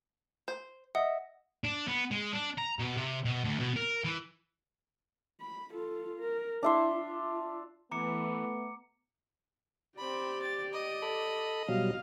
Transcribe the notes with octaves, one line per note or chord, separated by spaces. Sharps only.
C5
D#5 E5 F#5
D4
B3
G#3
D4
A#5
B2
C3
B2
D2
B2
A#4
E3
B5
F4 A4
A#4
D4 E4 E5 C6
F4
E3 A3 B3 A#5 D6 C#7
C4 G4 D5 B5
A6
D#5
A4 B5
B2 F#3 G3 F5